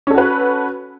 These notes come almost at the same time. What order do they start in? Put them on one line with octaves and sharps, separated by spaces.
C#4 A4 F#4 B4